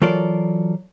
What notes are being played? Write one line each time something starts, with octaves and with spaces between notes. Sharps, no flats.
E3 F#3 F4 A4 A#4 D5